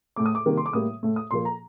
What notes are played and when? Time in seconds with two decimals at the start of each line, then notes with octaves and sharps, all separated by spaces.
0.16 A2 A3 D6
0.26 D#6
0.35 D6
0.46 C3 D#3 G3 A#3
0.57 C6
0.66 D6
0.73 A2 G3 A#3 D#6
1.03 A2 A3
1.16 D#6
1.31 A#2 F3 A#3 C6
1.45 A#5